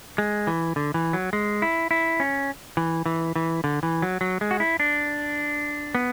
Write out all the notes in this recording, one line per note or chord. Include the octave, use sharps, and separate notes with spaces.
G#3
E3
D3
E3
F#3
G#3
E4
E4
C#4
E3
E3
E3
D3
E3
F#3
F#3
G#3
F#4
E4
D4
B3